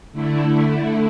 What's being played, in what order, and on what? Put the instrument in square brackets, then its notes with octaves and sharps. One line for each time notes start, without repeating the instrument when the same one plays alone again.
[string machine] D3 A3 E4